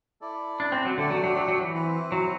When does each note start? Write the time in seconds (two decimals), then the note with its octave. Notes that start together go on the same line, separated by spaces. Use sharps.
0.21 E4 A4 D5
0.60 D4
0.72 C4
0.85 F#3
0.98 D3 A3 D4 G4 D5
1.10 F#3
1.23 F#3
1.36 F#3
1.48 F#3
1.61 E3
1.74 C4 E4 B4
2.12 F#3